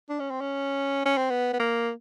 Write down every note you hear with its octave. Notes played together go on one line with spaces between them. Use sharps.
D4
C#4
C4
C#4
C#4
C4
B3
B3
A#3